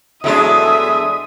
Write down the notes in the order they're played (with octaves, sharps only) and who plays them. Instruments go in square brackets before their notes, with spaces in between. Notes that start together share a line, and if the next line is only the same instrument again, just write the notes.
[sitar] E2 G#3 D4 [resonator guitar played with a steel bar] F#3 A3 E4 [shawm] E5 [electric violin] D#6